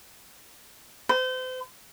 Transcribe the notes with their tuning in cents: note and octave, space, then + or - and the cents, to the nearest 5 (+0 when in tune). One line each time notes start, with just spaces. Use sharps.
C5 -35